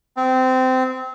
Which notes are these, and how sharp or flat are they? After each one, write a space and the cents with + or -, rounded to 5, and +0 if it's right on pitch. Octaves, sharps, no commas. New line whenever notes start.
C4 -20